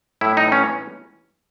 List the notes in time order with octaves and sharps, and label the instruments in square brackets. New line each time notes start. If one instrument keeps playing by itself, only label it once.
[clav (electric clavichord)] A2 E4
D#4
E3
C#4